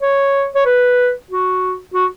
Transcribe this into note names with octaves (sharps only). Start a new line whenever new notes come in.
C#5
C#5
B4
F#4
F#4